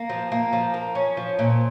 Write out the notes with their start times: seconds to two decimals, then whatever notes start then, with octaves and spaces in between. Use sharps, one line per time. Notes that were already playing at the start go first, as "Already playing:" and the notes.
Already playing: A#3
0.10 F3
0.32 A#3
0.53 F3
0.74 A#3
0.95 C#4
1.17 F3
1.39 A#2